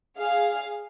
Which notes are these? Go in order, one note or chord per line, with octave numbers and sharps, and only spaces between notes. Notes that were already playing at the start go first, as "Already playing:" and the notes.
G#4 F5